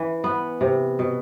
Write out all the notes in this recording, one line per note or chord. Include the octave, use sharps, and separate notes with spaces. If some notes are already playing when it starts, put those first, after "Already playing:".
Already playing: E3
B3
C3
B2